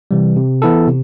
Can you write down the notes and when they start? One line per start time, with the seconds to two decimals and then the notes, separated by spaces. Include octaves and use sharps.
0.11 C3 E3 G3
0.37 C3
0.62 E3 B3 E4 A4
0.88 C3